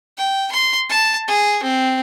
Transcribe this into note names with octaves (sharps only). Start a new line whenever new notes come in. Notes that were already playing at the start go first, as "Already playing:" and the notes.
G5
C6
A5
G#4
C4